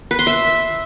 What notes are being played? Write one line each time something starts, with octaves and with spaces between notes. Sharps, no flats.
B4
C6
E5